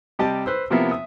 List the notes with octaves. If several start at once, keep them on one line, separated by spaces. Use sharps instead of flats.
C3 G3 G4 D#5 A5
B4 C5 E6
C3 F3 A#3 B3 E4
E5 D#6